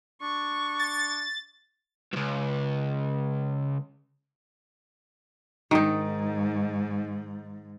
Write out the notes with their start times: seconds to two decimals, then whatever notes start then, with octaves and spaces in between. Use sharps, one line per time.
0.22 D4 C#6
0.79 A6
2.13 C#2 G2
5.71 G#2 D#3 D#4